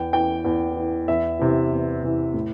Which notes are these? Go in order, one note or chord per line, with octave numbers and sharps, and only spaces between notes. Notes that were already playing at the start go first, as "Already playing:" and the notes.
Already playing: E2 G5
E3 G5
E2
E3
E2 E5
C3 E3
E2
C3 E3
A2